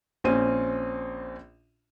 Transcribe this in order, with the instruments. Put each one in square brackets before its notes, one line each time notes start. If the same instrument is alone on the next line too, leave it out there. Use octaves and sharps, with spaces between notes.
[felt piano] A#1 C4 C#4 D#7